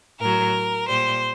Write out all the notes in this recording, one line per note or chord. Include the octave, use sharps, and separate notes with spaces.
A2 F#3 A#4
A#2 G3 C5